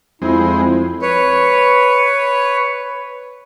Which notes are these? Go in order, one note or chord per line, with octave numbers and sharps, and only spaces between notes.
F2 G#3 C4 E4
B4 C#5